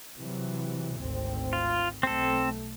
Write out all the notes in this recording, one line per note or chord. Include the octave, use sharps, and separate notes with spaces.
C3 E3 F#3
G#1 D2 C4
F4
B1 A3 C4 A4